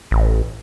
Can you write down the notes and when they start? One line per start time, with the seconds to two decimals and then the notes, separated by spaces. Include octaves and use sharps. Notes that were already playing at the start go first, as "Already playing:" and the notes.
0.11 A1